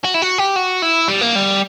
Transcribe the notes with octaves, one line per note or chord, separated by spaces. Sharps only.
F#4
E4
F#4
G4
F#4
E4
G3
A#3
G3